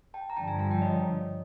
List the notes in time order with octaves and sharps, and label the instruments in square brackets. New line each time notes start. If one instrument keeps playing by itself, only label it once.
[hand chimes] G5 A5
A#5
[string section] G2 D3 F3 [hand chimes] G5 A5
[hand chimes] G#5 A#5
G#5 A#5
G5 A5
C#5 D#5